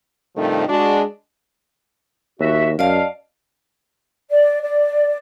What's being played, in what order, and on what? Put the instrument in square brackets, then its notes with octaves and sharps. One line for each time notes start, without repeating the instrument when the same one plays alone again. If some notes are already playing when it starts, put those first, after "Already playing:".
[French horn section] G2 C3 D#3 F3 A3 D#4
G#3 D4 F#4
[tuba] D#2 [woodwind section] F#4 E5
[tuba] F#2 [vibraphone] D5 D#5 A5 [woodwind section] F5
[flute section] D5
D5